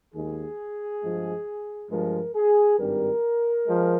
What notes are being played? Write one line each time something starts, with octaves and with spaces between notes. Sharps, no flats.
D#2 D#3 G#3 G#4
G2 F3 G#3
G2 F3 G#3 A#4
G#4
G#1 G2 G3 A#4
F3 G#3